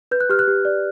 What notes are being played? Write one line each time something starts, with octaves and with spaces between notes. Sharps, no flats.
B4 G6
F#6
G4 F6
F#6
G4
D5